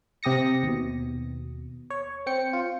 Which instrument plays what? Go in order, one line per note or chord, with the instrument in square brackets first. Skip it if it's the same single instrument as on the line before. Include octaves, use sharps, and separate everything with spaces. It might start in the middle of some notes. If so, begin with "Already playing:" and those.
[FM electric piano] C3 G4 D#6 A#6 C#7
D#2 B2
C#5
C4 G5 C#7
F4